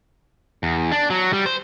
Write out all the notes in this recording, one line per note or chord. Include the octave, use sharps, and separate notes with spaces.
E2
D4
F#3
G3
C5